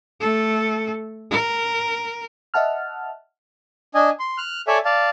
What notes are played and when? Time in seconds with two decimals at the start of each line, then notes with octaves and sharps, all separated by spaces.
0.21 A3 A4
1.31 A#4
2.54 D#5 E5 F#5 A5 F6
3.95 D4 D#5 G#5
4.20 C6
4.38 F6 F#6
4.67 A4 C#5 D5 E5 G#5
4.85 D5 F5 A5